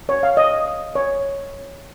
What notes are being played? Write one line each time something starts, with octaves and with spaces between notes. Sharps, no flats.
C#5
F5
D#5
C#5